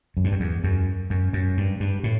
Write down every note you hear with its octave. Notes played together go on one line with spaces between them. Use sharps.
F#2
G2
F#2
E2
F#2
F#2
F#2
G2
G2
A2